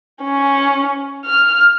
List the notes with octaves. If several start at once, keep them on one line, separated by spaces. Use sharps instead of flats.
C#4
F6